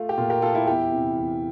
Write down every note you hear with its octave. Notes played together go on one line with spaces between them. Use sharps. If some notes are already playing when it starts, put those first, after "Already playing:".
Already playing: A3 F4
G4
A#2 F4
G4 A#4
A3 F4 A4
E4 G4
E2 E4 G4
C3 E3
E2